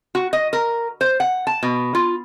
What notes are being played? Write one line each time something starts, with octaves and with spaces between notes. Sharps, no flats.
F#4
D#5
A#4
C5
F#5
A5
B2
F4